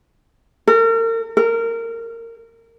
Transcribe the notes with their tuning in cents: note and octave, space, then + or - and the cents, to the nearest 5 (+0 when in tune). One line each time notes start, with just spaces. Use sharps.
A#4 -40
A#4 -20